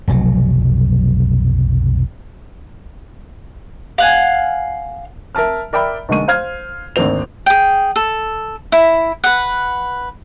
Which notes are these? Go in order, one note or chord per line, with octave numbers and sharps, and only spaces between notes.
F1 B1 F#3
F5 F#5 G#5
A#4 E5 A5 F6
A#4 D5 E5 G5 B5
B1 D3 G#3 A#3 C#6 D#7
C5 F5 F6 G#6
G#1 D2 A#3 C4 F7
G#4 G5
A4
E4
B4 F#5